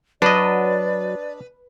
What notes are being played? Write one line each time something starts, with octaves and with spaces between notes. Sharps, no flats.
F#3 D4 B4 D5 D#5